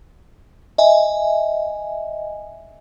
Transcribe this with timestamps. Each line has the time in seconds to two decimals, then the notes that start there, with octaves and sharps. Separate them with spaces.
0.78 D#5 E5 G#5